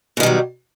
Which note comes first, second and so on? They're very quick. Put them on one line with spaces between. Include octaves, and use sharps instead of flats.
B2 D#3 G3 F#3